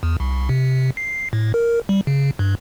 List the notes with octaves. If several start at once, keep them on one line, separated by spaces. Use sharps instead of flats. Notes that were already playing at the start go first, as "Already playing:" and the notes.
E2
C2
C3
C7
A2
A#4
G3
C#3
G2